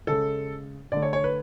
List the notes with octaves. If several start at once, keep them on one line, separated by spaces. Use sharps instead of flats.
C#3 G#3 A4
D3 A3 D5
C#5
C#5
B4